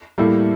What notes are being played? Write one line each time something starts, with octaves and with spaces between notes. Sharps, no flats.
A2 G3 A#3 E4 A4